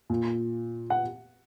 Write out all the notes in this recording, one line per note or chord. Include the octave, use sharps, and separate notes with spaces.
A#2
F#5